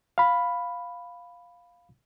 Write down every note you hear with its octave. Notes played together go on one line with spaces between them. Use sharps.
F5 B5